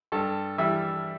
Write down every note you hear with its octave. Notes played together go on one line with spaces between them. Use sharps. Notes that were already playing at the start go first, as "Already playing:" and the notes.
G2 A4
E3 G3 E5